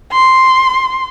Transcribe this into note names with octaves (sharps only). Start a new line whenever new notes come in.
C6